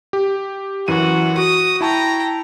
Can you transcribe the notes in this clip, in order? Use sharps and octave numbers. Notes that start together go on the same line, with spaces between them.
G4
F#2 E3 F#4 D#7
F#4 D#6
E4 G5 A5 A#5 C#6